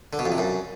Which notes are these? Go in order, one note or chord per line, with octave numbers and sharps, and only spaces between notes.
D3
B2
F2
C3
F#2